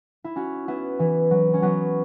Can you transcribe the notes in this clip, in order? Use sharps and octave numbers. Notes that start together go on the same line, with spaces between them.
E4
C#4 F#4
B3 E4
E3
F#3
C#4
F#3 B3